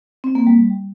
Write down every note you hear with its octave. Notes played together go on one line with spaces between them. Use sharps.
C4
A#3
G3